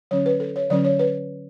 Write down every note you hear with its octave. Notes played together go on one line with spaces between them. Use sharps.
D3 F#3 C#4 C#5
B4
A4
C#5
D3 F#3 C#4 D5
C#5
B4